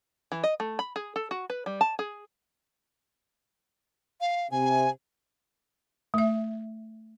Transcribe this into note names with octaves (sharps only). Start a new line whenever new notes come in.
E3
D#5
A3
B5
G#4
A4
F#4
B4
G3
A5
G#4
F5
C3 G#5
A3 E5